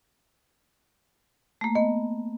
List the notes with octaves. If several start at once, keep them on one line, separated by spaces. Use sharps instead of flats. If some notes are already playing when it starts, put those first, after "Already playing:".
A3 A#3
B3 D#5